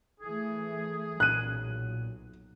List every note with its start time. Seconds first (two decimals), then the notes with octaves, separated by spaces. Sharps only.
0.20 E3 A3 G#4
1.20 B1 A#2 F#3 F#6 D#7